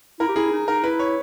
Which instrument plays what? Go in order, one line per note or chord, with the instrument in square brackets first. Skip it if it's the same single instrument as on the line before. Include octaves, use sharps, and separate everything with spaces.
[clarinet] E4 [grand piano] A#4
[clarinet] G4
[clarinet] E4 [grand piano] G#4
[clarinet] D#4
[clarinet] D#4 [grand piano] A#4
[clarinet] E4 [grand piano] B4
[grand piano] C#5